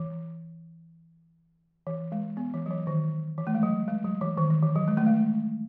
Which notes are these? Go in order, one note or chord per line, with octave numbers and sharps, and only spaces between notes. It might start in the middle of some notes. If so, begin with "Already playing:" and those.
Already playing: E3
E3
G#3
B3
E3
F#3
E3
D#3
E3
A3
G#3
F#3
G#3
F#3
E3
D#3
D#3
E3
F#3
G#3
A3
G#3